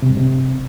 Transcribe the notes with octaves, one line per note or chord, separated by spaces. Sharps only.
C3
G2
C3